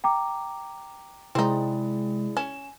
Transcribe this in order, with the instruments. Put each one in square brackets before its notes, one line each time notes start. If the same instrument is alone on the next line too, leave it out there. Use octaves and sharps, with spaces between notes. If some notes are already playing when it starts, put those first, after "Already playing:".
[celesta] G5 A#5 D6
[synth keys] C3 G#3 [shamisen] C4 D#4 [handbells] E4 G#4 D5
[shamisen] C#4 [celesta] G#5 [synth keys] E7